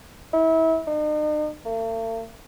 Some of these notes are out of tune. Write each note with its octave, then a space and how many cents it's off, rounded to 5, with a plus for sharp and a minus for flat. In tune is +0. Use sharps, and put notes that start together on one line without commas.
E4 -30
D#4 -45
A3 +45